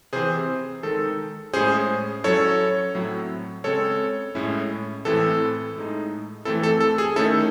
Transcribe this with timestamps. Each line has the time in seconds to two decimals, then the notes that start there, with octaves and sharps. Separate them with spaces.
0.13 C3 E3 C4 G#4 C5
0.83 D#3 G#3 D#4 A4
1.53 A2 G#3 C#4 G#4 C5
2.24 F#3 C#4 E4 A4 C#5
2.94 A2 F#3 C4 E4
3.64 C#3 G#3 C4 A4 C#5
4.35 A2 G#3 C#4 E4
5.05 A2 E3 C4 E4 A4
5.75 A2 G#3 D#4
6.45 E3 A3 C4 E4 A4
6.63 A4
6.80 A4
6.98 G#4
7.16 D#3 A3 C#4 E4 A4